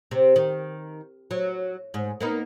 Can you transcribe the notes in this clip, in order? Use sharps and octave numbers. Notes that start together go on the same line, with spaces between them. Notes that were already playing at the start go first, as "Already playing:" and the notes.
C3 C4
D#3
F#3
G#2
A#3 B3 D#4